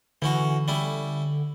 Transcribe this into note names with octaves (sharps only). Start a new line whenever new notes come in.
D3 E3 C#4 F#4
G3 C#4 E4